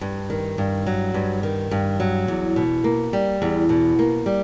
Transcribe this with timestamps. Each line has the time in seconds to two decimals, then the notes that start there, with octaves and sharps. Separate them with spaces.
0.01 G2
0.30 D#3
0.58 G2
0.87 F#3
1.14 G2
1.43 D#3
1.71 G2
2.00 F#3
2.28 E2
2.56 B2
2.84 A#3
3.13 G3
3.42 E2
3.69 B2
3.99 A#3
4.26 G3